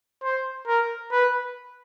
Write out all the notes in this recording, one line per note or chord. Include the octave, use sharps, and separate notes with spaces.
C5
A#4
B4